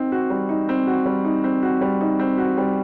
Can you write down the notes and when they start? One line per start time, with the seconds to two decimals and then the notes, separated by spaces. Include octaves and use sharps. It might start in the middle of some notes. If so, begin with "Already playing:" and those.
Already playing: C4 D#4
0.12 F#4
0.30 G3
0.49 D#4
0.69 C4
0.87 F#4
1.06 G3
1.25 D#4
1.44 C4
1.63 F#4
1.81 G3
2.01 D#4
2.19 C4
2.38 F#4
2.57 G3